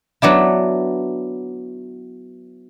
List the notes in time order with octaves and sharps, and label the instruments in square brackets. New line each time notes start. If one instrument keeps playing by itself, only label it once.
[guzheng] F#3 B3 D4 E4